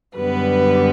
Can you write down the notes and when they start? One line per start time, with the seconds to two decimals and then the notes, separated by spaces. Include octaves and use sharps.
0.16 F#2 D3 G3 B3 B4